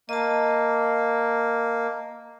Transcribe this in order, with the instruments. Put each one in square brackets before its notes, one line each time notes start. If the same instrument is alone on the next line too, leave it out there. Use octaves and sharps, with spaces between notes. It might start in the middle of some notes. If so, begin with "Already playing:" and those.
[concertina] A#3 [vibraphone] D#5 A5